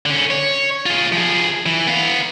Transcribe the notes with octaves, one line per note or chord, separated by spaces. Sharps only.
D3 C#4
C#5
F4 G#4
F3 G#4
E3
B3 F5